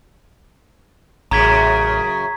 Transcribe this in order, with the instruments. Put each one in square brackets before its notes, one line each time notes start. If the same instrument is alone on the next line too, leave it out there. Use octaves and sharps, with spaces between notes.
[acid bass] A1 [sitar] F#2 C#3 [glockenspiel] A#5 G#6 B6